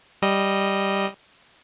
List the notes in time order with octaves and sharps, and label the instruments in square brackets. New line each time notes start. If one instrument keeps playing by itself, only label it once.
[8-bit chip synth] G3 D#5